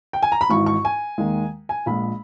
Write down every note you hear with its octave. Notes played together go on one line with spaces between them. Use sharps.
G5
G#5
A#5
B5
G#1 G#2 E3 C#6
C#6
G#5
D#2 D#3 G#3
G#5
A#1 A#2 G#3 B5